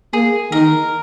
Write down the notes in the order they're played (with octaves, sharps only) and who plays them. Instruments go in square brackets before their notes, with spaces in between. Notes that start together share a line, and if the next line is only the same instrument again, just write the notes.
[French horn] A#3 [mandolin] G#4
[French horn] D#3 [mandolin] A#4